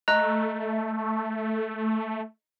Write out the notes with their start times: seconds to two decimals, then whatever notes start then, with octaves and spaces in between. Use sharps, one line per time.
0.08 A3 D#5 A#5 F#6